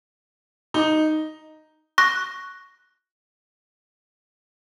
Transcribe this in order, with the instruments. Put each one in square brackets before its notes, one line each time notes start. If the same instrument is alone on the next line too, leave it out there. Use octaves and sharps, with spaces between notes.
[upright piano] D#4
[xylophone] C#6 F#6 A#6